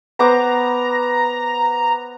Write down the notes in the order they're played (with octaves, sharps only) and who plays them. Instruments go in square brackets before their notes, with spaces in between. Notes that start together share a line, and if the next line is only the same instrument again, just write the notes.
[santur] B3 C5 D6 [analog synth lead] A#5